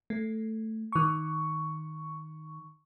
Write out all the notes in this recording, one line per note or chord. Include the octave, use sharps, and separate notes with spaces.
A3
D#3 C#6